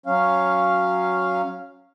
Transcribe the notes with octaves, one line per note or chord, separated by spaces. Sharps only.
F#3 C#4 F5